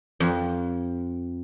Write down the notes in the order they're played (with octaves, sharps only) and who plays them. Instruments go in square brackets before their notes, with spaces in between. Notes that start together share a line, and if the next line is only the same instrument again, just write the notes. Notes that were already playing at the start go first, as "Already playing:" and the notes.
[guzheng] F2